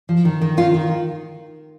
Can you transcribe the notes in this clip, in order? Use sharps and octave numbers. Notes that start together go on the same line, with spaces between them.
F3
D#3
D#3
D#3 F4
D#3